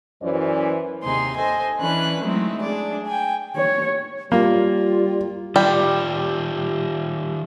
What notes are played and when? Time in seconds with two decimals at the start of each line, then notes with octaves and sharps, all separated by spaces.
0.22 F#2 E3 F#3 C#4 C5 D5
1.03 D#2 C3 D#4 G#4 C6
1.37 A4 C5 D#5 G#5
1.79 E3 C#4 D4 B4 F#6
2.23 F#3 G#3 A3 C4 D#4 E4
2.62 D4 G#4 D5
3.06 G5 G#5
3.56 C#5
4.32 G3 A#3 F4
5.56 D#3 G3 F4 G4